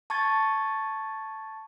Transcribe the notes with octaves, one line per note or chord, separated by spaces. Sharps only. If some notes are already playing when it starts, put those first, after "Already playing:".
A5 C#6 G#6 A6